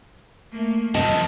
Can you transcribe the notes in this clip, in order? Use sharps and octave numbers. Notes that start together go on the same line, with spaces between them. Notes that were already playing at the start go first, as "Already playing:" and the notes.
A3 A#3
F2 C3 D#3 F3 D#5 A5